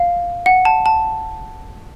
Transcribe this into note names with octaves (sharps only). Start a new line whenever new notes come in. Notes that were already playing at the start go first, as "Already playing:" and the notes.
Already playing: F5
F#5
A5
A5